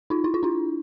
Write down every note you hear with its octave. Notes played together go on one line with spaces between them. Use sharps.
D#4 F4
E4
F4
D4 E4